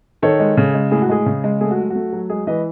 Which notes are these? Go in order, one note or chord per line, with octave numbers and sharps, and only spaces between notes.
D#3 A4 C#5
G#3
C#3
G#3
A2 G#4
F#4
G#3 G#4
C#3
G#3
A3 G#4
F#4
F#3
F#4
A3
F#3
G#3 G#4
E3 B4 D#5